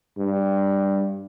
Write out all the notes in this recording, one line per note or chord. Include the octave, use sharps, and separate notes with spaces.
G2